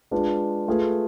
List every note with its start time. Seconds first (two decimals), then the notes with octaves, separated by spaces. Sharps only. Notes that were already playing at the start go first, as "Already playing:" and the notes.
0.11 G#3 D4 F4 B4
0.68 A3 F4 G#4 B4